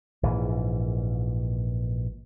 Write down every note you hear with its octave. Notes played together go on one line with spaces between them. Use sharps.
A#1 G#2 E3